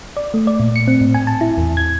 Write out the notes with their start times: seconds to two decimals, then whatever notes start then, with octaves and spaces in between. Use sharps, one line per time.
0.17 D5
0.34 A3
0.47 D5
0.60 A#2
0.76 C#7
0.88 C4
1.01 A2
1.14 G#5
1.27 A5
1.41 E4
1.58 E2
1.77 G#6